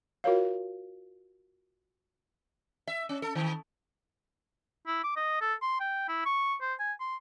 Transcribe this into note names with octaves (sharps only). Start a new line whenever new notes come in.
F4 F#4 A#4 C#5 F5
E5
C#4
A4
D#3
E4
D6
D#5
A4
C6
G5
E4
C#6
C5
G#5
C6